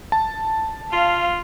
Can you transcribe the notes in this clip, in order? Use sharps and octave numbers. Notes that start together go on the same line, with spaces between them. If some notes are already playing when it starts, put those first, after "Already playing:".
A5
F4 F5